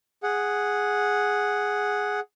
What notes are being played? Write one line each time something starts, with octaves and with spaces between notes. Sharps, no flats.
G#4 F#5